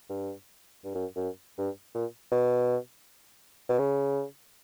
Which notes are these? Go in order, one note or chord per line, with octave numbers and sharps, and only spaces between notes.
G2
G2
F#2
F#2
G2
A#2
B2
B2
C#3